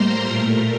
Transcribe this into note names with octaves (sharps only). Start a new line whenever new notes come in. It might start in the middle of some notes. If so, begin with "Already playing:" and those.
Already playing: A2 G3 A#3 C5 A#5 C6
A#2 A3 A#4